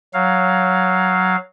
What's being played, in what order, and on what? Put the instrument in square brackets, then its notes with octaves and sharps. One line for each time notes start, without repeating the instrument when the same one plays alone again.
[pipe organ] F#3 F5